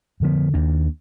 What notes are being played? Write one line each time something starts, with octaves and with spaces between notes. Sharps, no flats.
F2 D3 F3 B3
D#2 D#3 A#3 D4